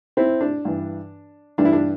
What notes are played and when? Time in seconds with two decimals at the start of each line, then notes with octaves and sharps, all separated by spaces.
0.17 C4 E4
0.41 D4
0.65 G2 E3
1.58 G2 E3 D4
1.65 E4
1.73 D4